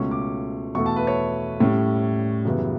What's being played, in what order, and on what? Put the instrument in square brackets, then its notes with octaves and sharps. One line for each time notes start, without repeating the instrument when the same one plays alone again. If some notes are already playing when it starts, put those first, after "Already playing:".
Already playing: [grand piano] C#2 B2 A3 C#4 C#6
D6
E2 B2 A3 C#6
A5
B4
C#5
A2 G3 C#4
F#2 C#3 E3 G3 B3